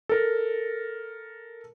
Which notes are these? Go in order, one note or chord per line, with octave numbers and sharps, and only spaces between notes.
A4 A#4